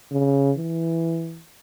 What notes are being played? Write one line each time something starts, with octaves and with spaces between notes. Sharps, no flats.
C#3
E3